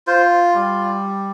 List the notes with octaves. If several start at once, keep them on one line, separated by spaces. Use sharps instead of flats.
F4 C5
G3